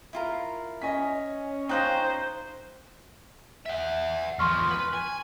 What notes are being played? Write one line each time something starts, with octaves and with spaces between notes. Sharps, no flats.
E4 F4 A#4
C#4 D#5 G#5 B6
D#4 F4 C5 C#5 G5 F#6 A#6
E5 F#5
E2 F3 C6 C#6 F6
B4
G#5